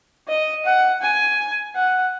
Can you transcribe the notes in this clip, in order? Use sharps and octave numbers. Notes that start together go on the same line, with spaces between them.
D#5
F#5
G#5
F#5